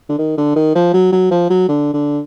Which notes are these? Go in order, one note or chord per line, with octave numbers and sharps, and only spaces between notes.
D3
D#3
D3
D#3
F3
F#3
F#3
F3
F#3
D3
D3